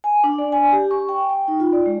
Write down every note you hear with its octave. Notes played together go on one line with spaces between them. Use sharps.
G#5
D4
D5
G#5
G4
C#6
G5
G5
D#4
F4
D5
G#3